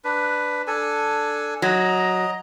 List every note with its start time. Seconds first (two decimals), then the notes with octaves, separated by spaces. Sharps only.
0.04 D4 B4
0.67 D4 A4 G#5
1.62 F#3 D#5 A#5